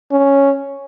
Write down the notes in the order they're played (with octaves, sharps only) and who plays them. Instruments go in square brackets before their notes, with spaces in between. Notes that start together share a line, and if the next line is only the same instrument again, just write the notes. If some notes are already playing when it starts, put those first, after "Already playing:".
[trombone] C#4